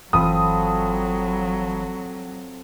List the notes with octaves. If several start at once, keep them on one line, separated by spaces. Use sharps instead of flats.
G1 E3 F#3 C4 F4 A4 B5 D#6